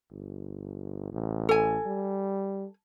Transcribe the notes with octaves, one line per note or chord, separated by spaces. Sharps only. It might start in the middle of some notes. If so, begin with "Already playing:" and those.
G1
A1
A4 G#5
G3